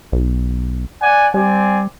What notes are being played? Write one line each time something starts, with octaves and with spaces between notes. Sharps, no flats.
B1
D5 F#5 G#5
G3 C4 D5 G#5